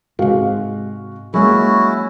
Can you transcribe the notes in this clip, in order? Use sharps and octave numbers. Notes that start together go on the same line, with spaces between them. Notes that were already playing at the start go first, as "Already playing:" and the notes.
G#2 C3 G#3 F#4 F5
F#3 G#3 A#3 C#4 E4 F#4